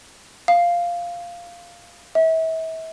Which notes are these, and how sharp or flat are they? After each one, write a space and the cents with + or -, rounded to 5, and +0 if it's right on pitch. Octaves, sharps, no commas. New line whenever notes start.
F5 -5
E5 -35